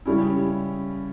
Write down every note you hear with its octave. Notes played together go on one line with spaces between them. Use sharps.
C#3 G3 C#4 E4